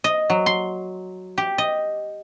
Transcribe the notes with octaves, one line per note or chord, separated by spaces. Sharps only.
D#5
F#3
C6
G4
D#5